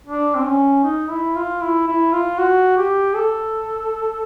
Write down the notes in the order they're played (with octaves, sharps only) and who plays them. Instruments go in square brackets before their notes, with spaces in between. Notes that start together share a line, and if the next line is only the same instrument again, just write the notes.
[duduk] D4
C4
C#4
D#4
E4
F4
E4
E4
F4
F#4
G4
A4